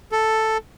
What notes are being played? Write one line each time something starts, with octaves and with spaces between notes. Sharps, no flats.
A4